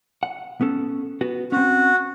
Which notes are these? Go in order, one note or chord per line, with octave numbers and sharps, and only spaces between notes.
F#5
B3 C#4 A4
B3 F#4
C4 C#4 F#4